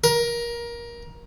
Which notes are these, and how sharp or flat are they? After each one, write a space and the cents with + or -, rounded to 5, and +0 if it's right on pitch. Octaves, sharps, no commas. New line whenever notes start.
A#4 +20